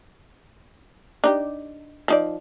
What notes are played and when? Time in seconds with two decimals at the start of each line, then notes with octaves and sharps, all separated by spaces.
1.24 D4 D#4 G4
2.08 F3 D#4 D5